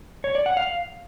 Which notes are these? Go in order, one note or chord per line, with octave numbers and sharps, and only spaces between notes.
C#5
D5
F#5
F5